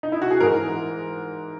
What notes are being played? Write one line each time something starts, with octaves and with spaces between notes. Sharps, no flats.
D#4
E4
F#4
G#4
G#2 E3 A#4